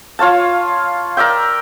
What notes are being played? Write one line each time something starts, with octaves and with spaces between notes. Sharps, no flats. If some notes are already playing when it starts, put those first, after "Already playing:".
F4 C#5 F5 A5
A#4 D5 E5 G5